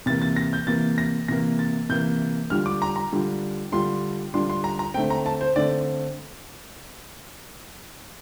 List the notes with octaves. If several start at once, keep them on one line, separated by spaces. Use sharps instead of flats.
C3 E3 A#3 A6
A6
A#6
G6
C3 E3 A#3 A6
A#6
C3 E3 A#3 A#6
A6
C3 E3 A#3 G6
D3 G3 D4 F4 F6
D6
A#5
A#5
D3 G3 D4 F4
D3 G3 D4 F4 C6
D3 G3 D4 F4 C6
C6
A#5
A#5
D3 A3 C4 G5
A#5
A5
C5
D3 A3 C4 D5